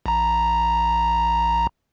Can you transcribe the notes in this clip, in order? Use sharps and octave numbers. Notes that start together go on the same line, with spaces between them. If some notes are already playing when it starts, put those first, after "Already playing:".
A#1 A#5